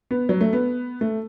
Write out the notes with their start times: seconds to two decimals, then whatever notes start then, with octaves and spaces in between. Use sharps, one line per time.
0.11 B3
0.29 F#3
0.41 A3
0.53 B3
1.01 A3